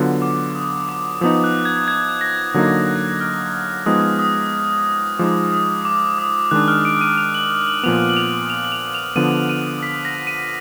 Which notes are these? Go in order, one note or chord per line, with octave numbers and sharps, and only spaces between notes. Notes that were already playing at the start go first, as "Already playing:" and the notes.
Already playing: D3 F#3 B3 F4
D6
D#6
D6
F3 B3 D#4 D#6
F#6
G#6
G#6
A#6
D3 F#3 A#3 D#4 G#6
F#6
F6
F3 G#3 B3 D#4 D#6
D#6
F3 G#3 D#4 D6
D#6
D6
D#6
D#3 G#3 D4 F#6
F6
D7
D#7
F7
F#7
F#7
F#7
A#2 F3 B3 F7
F#7
F7
F7
F#7
F7
F7
D3 F3 B3 D#7
D#7
B6
A#6
D#7